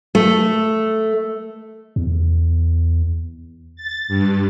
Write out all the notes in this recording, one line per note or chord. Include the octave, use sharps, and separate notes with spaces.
A3
E2
A6
G2